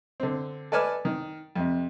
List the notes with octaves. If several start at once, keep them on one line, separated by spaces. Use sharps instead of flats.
D3 C4
A4 B4 D5 G#5 A5 F6
D#3
F2 C3